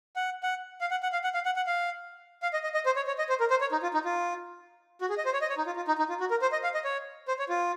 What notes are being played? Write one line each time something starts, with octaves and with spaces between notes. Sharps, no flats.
F#5
F#5
F5
F#5
F#5
F5
F#5
F5
F#5
F#5
F5
F5
D#5
D#5
D#5
C5
C#5
C#5
D#5
C5
A#4
C5
C#5
D#4
F4
D#4
F4
F#4
G#4
D#5
C5
C#5
D#5
C#5
D#4
F4
F4
D#4
D#4
F4
F#4
A#4
C5
D#5
F5
D#5
C#5
C5
C#5
F4